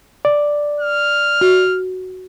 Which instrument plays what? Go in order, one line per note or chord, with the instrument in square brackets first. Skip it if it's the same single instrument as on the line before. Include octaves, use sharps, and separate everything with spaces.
[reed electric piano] D5
[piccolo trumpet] F6
[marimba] F#4